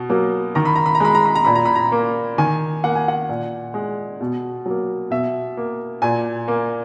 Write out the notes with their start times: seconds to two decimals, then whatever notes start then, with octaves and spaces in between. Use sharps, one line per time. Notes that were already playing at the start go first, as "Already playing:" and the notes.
Already playing: B2
0.09 F#3 A#3
0.55 D#3 A#5
0.65 B5
0.76 A#5
0.86 B5
0.95 A#5
1.00 G#3 B5
1.15 A#5
1.25 B5
1.35 A#5
1.45 A#2 B5
1.55 A#5
1.65 B5
1.75 A#5
1.92 A#3
2.38 D#3 G#5
2.84 A#3 F#5
2.95 G#5
3.08 F#5
3.29 A#2
3.74 G#3
4.21 B2
4.66 F#3 A#3
5.11 B2 E5
5.57 A#3
6.02 A#2 G#5
6.48 A#3